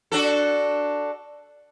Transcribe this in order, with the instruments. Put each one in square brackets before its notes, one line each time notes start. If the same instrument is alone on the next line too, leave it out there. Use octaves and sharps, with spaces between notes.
[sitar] D4 F#4 A4